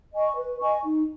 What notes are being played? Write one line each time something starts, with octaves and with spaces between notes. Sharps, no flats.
D#5 G#5 C#6
B4
D#5 G#5 C#6
D#4